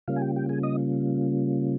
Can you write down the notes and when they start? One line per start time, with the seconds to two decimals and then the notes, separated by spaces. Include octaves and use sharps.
0.08 C#3 G3 A#3 C#4 F4 F5
0.16 G#5
0.21 G4 G5
0.36 G4 G5
0.49 G#4 G#5
0.63 D#5 D#6